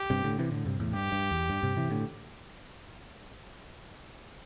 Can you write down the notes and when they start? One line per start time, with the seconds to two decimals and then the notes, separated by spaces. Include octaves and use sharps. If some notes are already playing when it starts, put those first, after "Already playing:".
Already playing: G4
0.10 G2 C3
0.24 A2 D3
0.38 C3 E3
0.52 A2 D3
0.66 G2 C3
0.80 E2 A2
0.93 G2 G4
1.12 G2
1.31 E2
1.50 G2
1.63 G2 C3
1.76 C3 E3
1.90 A2 D3